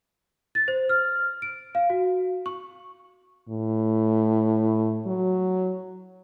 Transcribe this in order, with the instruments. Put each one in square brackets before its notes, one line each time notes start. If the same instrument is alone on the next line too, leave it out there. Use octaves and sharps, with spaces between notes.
[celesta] A6
C5
F6
D7
F5
F#4
C#6
[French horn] A2
F#3